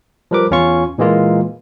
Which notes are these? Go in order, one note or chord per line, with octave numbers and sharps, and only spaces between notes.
F3 G3 A#4 B4 D6
E2 C#4 F4 C#6
A#2 E3 G#3 A#3 F4